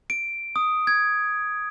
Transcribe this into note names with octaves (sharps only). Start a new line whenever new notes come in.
D7
D#6
G#6